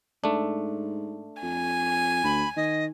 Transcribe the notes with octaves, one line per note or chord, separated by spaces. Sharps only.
G#2 A3 D4
F2 G#5
D2 B5
D#3 D#5